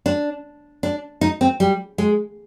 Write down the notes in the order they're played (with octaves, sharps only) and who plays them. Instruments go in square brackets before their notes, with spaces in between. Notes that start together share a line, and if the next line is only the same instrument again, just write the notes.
[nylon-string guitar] D4
D4
D#4
C4
G3
G#3